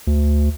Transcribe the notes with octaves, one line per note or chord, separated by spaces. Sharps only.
D2